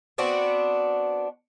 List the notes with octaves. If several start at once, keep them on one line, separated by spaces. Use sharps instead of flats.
B3 C4 D4 F#4